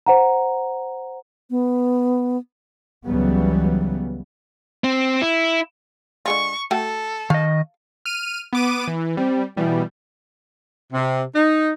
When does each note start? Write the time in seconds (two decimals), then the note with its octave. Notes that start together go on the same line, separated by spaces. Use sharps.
0.06 C5 F#5 A#5
1.50 B3
3.07 C#2 C#3 E3 F#3 G3 B3
4.84 C4
5.22 E4
6.26 D3 G#3 F4 C#6
6.71 A3 F#4 A4 G5
7.30 D#3 D#5 F5
8.06 F6 D#7
8.53 B3 D6 D#7
8.88 E3
9.17 G3 C4
9.57 B2 E3 G3
10.93 C3
11.36 D#4